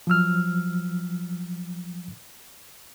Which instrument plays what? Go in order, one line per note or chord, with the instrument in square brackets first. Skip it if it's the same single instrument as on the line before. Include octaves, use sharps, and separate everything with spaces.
[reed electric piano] F3 F#3 E6 F6